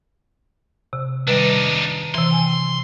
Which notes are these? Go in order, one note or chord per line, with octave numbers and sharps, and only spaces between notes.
C3
D#3 G3 D4 D#4 B4
C3 E3 C6
G5 G#5